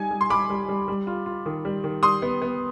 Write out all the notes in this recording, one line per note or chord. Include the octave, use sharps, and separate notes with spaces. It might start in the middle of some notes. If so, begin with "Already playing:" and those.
Already playing: G3 D#4 G#5
G3
C6
G3 B5 D6
G3
G3
G3
F4
F4
D#3
G3
D#3
G3 C6 D#6
B3
B3